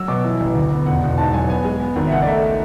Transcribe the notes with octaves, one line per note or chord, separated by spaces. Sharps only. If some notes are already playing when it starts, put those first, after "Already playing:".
Already playing: F#3 E6
B2 D6
E3
A1
D2
B3
E1 F#5
E1
G#2 A5
F#3 G#5
B3 G#5
G#3
B3
G#1
E5
C#2 F#5
D5
A3 E5